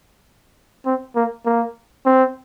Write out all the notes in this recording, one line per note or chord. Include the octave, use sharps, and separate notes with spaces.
C4
A#3
A#3
C4